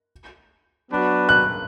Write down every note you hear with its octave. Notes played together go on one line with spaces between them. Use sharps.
F#3 B3 D4 F#4 B4
F#6